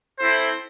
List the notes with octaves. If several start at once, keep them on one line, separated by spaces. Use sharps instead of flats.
C4 E4 A4 C5